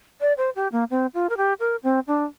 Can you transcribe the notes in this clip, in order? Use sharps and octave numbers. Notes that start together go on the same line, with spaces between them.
D5
C5
G4
A#3
C4
F4
A#4
G4
A#4
C4
D4